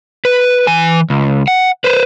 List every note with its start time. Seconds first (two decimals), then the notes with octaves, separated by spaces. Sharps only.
0.25 B4
0.67 E3 G#5
1.10 C#2
1.48 F#5
1.84 B4 C5